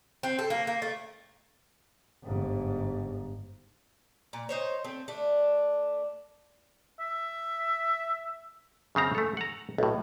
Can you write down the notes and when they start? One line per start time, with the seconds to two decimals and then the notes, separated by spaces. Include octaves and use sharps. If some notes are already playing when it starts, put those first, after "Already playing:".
0.23 C4
0.39 A4
0.50 A#3
0.67 A#3
0.82 A3
2.23 G1 G#2
4.33 A#2
4.49 D#4 C5 C#5
4.84 A3 C4
5.08 A3 D4
7.00 E5
8.95 F#2 C#3 C4 A#5
9.15 A3 A4
9.37 F#5 A#5
9.78 B1 A2